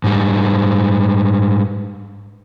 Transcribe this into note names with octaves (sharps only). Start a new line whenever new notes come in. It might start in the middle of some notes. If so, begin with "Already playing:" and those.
G#2 G3